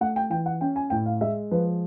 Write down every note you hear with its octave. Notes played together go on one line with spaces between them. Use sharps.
A3 F#5
G5
E3 G5
F#5
C#4 G5
G#5
A2 G5
F5
G#3 E5
F3 B4